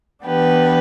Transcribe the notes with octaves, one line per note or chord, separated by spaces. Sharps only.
E3 B3 D4 G4 B4